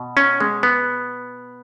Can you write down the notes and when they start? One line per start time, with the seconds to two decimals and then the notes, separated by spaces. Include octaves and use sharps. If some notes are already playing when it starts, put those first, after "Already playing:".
Already playing: B2
0.17 C#4
0.40 G#3
0.63 B3